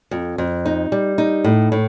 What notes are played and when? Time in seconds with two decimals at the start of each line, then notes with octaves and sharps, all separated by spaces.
0.11 F2
0.38 F2
0.66 D#4
0.92 G3
1.18 D#4
1.44 A2
1.72 A2